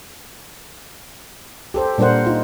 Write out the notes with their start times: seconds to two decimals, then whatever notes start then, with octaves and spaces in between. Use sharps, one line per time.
1.74 G4 A4 C5
1.98 A#2 G3 D4 A#4 C5 F#5
2.26 D#4 F4